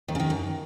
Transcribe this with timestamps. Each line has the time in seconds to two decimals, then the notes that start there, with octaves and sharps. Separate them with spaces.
0.08 D#2 D#3
0.15 C#3
0.19 D#2 D#3
0.30 F#2